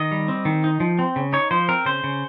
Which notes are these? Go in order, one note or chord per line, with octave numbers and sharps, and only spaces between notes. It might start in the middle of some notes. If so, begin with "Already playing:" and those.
Already playing: D#3 D#5
G3
C4
D#3
D#4
F3
C4
C#3
D#4 C#5
F3 C5
C4 A#4
C#3 C5
C#3